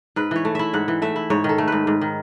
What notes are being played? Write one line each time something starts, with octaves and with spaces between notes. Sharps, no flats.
G#2 B4
E3 C#5
A3
E4 E5
G#2 F#5
E3
A3 E5
E4
G#2 C#5
D#3 A4
A3
G#2 B4
G#2
D#3